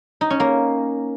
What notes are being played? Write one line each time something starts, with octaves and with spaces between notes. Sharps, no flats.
D#4
C#4
A#3